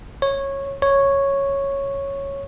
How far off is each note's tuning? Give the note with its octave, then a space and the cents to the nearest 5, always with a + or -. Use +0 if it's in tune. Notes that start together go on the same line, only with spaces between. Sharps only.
C#5 -15
C#5 -5